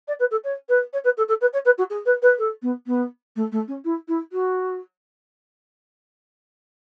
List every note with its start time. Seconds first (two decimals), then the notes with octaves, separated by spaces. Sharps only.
0.08 D5
0.19 B4
0.31 A4
0.44 C#5
0.68 B4
0.93 C#5
1.04 B4
1.17 A4
1.28 A4
1.41 B4
1.53 C#5
1.65 B4
1.78 F#4
1.90 G#4
2.05 B4
2.22 B4
2.38 A4
2.62 B3
2.87 B3
3.36 A3
3.52 A3
3.68 C#4
3.84 E4
4.08 E4
4.32 F#4